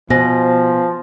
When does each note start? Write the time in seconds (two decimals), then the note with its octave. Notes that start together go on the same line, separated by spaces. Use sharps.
0.10 B2 F3 B3 C5 G#5 A#6